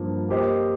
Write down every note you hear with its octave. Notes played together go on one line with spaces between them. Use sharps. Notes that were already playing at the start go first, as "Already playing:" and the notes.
Already playing: G2 F3 A#3
A#3 G4 C5 D#5